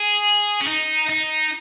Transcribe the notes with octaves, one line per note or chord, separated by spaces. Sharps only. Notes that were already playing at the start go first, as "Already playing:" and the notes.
Already playing: G#4
C#4
D#4
D#4